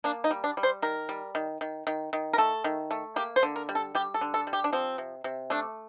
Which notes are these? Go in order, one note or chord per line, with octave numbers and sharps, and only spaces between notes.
A#3 D4
D#4
G3
D4
G3
C5
D#3 A#4
G3
D#3
D#3
D#3
D#3
A#4
A3 A4
D#3
A3
A#3 G4
C5
D3
A#4
G3
A4
G3 G4
A4
D3
A4
G3
G4
D4
F3 C4
C3
C3
A3 D4